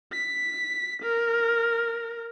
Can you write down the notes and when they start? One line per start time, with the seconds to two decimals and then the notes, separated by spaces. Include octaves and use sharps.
0.12 B6
1.02 A#4